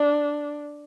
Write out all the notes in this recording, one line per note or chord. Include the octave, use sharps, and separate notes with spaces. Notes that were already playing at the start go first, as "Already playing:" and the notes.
Already playing: D4